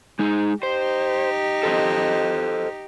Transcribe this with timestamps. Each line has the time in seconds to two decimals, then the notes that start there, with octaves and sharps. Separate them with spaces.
0.19 G#3 D#4 G#4
0.63 D#4 G4 C5
1.63 A4 C5 D#5